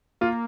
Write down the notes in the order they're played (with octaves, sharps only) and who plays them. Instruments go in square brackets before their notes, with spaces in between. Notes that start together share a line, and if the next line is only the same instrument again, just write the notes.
[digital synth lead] A#3 [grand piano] F4